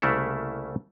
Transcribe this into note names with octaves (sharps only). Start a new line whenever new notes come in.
C2 C#3 A3 A#3 E4 A4